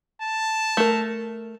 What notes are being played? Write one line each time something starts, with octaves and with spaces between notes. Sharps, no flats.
A5
A3 A#4